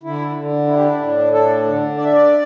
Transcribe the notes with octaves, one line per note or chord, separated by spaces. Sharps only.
D3 E4
D3
D4 E4
G4
E4
A2
D4 A4
D3
D4 D5
E5
D5